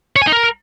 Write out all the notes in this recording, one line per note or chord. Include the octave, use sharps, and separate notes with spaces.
C#5
G#5
D#4
A#4